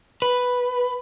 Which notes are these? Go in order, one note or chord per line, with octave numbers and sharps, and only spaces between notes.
B4